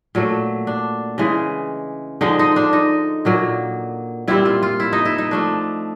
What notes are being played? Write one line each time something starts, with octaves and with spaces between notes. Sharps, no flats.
A#2 F#3 A3
D4
C#3 E3 G#3
D3 F3 G#3 D#4
D#4
D4
D#4
A#2 F#3 A#3
A#2 G3 C4 E4
F4
F4
E4
D#4
E4
D#4
F3 A3 D4